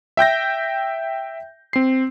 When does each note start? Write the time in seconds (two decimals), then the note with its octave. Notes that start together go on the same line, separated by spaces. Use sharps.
0.17 E5 G5 G6 A#6
1.73 C4 C7